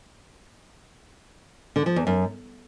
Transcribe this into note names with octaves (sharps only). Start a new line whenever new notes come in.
D3
F3
E2
F#2